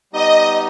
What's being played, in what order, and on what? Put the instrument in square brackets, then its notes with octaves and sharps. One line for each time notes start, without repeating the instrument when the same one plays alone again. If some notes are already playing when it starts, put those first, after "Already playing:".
[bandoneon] G3 B3 D#4 G4 [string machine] D#5